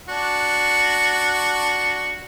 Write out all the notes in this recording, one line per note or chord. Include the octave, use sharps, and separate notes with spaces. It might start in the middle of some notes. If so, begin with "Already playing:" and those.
D4 F#4